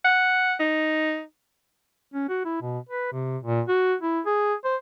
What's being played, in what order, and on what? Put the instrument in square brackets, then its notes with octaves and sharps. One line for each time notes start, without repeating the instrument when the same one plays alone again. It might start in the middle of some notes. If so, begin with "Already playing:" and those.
[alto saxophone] F#5
D#4
[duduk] C#4
F#4
E4
B2
B4
C3
A#2
F#4
E4
G#4
C5